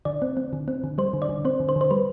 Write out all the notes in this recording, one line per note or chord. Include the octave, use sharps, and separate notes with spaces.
D3 D5
C4
C4
D3
C4
D3
G3 C5
D3
D5
D3
C4 C5
D3
C5
D3
C5
G3 B4